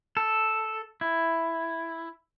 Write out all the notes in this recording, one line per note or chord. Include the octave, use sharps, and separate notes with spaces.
A4
E4